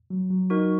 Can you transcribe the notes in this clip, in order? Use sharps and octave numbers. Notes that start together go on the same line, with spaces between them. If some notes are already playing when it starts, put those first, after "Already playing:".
F#3
F#3
D#4 F#4 A#4